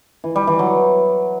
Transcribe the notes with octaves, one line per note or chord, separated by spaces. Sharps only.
E3
G3
E3
F#3